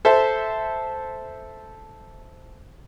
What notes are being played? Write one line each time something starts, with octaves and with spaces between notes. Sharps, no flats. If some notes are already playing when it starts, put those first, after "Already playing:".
A4 C5 E5